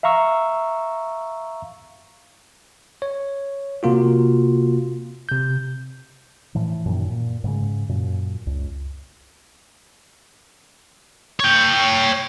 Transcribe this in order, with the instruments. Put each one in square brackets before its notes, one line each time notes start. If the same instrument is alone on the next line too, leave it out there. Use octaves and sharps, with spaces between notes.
[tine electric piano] E5 F5 A#5 C#6 E6
C#5
C3 A#3 F4 F#4
C3 G6
[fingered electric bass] A2 E3 F3
F#2 A#2 D#3
A#2
G#2 C#3 G#3
F#2 A#2
C#2
[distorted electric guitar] C#5 G5